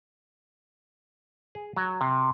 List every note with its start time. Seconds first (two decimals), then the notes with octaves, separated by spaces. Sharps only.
1.55 G#4
1.76 F#3
2.01 C3